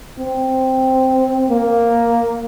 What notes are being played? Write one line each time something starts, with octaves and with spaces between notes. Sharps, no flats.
C4
A#3